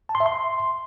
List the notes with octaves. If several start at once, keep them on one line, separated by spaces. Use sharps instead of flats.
A5
C6
E5
C6